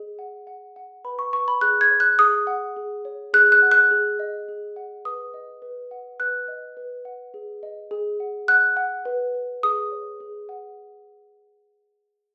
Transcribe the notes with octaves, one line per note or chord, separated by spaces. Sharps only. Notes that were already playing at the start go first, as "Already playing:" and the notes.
Already playing: G#4 D#5
F#5
F#5
F#5
B4 B5
C#6
B4 C#6
B5
G#4 F#6
G#6
C#5
F#6
G#4 D#6
F#5
G#4
C#5
G#4 F#6
F#6
F#5
F#6
G#4
D#5
G#4
F#5
B4 D#6
D#5
B4
F#5
B4 F#6
D#5
B4
F#5
G#4
D#5
G#4
F#5
F#5 F#6
F#5
B4
B4
G#4 D#6
C#5
G#4
F#5